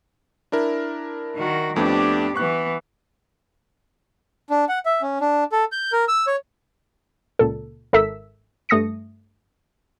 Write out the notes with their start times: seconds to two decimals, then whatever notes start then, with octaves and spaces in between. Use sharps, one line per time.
0.52 D4 E4 A#4
1.36 D#3 F#4
1.76 F2 A3 B3 D4 G4
2.36 E3 B3 C#6 F#6
4.50 D4
4.69 F#5
4.86 E5
5.02 C#4
5.21 D4
5.52 A4
5.72 G6
5.92 A#4
6.08 E6
6.27 C#5
7.39 C#2 A#2 A4
7.93 G#1 A4 A#4 E5 E6 B6
8.69 G2 A3 D#6 A#6 C#7